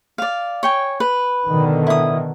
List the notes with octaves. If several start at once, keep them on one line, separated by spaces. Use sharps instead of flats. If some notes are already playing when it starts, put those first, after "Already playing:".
D5 F5
C#5 G5 G#5
B4
B2 D3 D#3
E4 D#6